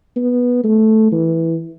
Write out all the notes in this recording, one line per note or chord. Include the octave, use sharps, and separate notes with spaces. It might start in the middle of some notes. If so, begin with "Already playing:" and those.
B3
A3
E3